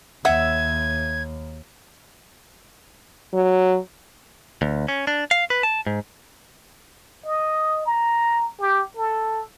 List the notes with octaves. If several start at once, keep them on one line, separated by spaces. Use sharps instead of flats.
D#2 E5 F#5 G#6
F#3
D2
C#4
D4
F5
B4
A5
G#2
D#5
A#5
G4
A4